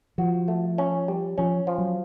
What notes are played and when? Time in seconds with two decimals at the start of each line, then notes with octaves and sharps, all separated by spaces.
0.18 F3 F#4
0.48 A3
0.78 C#4
1.08 G3
1.38 F3 C#4
1.67 F3
1.78 F#3